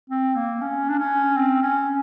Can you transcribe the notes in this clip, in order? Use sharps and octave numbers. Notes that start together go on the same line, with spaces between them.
C4
A#3
C#4
D4
C#4
C4
C#4